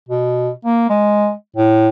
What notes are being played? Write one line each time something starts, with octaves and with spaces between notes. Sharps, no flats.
B2
A#3
G#3
A2